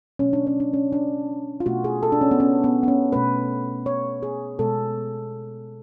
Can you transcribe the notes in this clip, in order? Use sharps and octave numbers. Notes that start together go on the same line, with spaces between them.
B2 F#3 A3 C#4
D4
C#4
D4
C#4
D4
F4
B2 A3 F#4
G#4
A4
D4
C#4
B3
C#4
B3
B3
C#4
B2 A3 B4
C#5
G#4
B2 G#3 A4